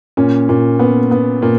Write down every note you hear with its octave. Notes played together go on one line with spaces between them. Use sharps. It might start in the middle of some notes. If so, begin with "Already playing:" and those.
A#2 C#4
A#2
B3
B3
A#2